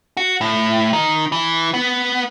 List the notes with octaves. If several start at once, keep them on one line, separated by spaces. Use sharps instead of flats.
F#4
A2
D#3
E3
B3